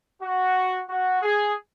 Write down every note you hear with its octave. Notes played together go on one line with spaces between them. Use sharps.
F#4
F#4
G#4